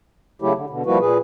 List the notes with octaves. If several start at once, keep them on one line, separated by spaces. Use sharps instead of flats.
C#3 F#3 A3 E4 G4
D3
B2 D3
F3 G3 A#3 E4 F#4 B4
A#2 G#4 B4